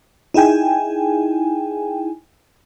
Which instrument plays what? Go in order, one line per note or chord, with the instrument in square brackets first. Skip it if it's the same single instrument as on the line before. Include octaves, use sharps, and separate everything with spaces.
[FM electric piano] D#4 E4 G#4 G5 G#5